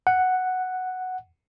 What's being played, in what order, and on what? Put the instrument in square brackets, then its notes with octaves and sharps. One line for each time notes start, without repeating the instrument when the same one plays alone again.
[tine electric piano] F#5